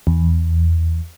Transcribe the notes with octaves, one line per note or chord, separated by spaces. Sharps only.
E2